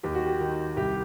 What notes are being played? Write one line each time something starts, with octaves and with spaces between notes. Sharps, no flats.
D#2 G4
F#4
G4
D#3
C2 G4